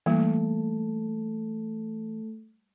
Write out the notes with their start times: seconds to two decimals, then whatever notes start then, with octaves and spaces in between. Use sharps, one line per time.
0.06 E3 G3 A3 A#3 A4